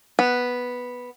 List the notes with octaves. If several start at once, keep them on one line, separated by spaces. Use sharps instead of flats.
B3